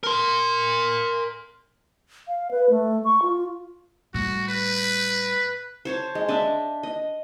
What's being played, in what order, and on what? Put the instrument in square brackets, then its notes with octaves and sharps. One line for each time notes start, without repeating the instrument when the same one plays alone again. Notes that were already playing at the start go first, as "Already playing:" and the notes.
[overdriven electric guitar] A#4 C6
[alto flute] F5
B4
A3
C#6
F4
[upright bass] A2 G3 [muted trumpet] F#4
[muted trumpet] B4
[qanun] C5 C#5 A5
G#3
D4 D#5 E5
D#5